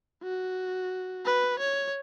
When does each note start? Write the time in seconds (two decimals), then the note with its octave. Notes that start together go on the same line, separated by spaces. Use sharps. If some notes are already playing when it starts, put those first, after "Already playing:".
0.23 F#4
1.26 B4
1.59 C#5